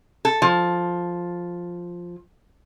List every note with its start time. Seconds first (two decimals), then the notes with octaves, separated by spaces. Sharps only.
0.25 A4
0.42 F3